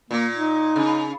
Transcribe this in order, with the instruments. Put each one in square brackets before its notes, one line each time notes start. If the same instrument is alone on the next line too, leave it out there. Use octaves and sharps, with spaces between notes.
[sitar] A#2 [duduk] A#3
[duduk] D#4
[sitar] C#3